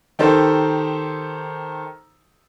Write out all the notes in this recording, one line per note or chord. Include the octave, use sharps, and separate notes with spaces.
D#3 D#4 G4 A4 C5